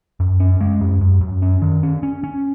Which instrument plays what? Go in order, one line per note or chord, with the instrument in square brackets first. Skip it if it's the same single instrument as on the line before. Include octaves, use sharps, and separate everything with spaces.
[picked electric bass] F#2
C#4
G#3
F#2
F#2
F#2
C#4
D#3
C#4
C#4
C#4